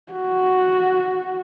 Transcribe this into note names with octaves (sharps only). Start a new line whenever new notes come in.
F#4